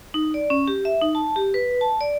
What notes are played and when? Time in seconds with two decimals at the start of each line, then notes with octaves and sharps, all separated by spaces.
0.14 D#4
0.34 D5
0.50 C#4
0.68 G4
0.85 E5
1.02 D#4
1.15 A5
1.36 G4
1.54 B4
1.81 A5
2.01 D5